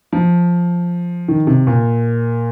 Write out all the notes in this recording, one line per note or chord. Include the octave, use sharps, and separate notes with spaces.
F3
D#3
C3
A#2